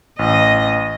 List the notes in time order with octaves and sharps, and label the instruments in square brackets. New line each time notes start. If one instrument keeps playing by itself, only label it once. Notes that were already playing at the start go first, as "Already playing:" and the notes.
[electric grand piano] A1 [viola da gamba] D#5